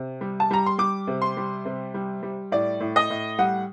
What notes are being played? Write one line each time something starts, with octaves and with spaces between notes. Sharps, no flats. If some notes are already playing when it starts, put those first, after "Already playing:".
Already playing: C3
G3
A5
G3 A#5
C6
G3 D6
C3
C6
G3
C3
G3
G3
A2 D5
A2
D#5
A2
G3 F#5